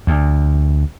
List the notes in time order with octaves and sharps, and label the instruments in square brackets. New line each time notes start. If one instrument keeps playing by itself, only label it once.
[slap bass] D2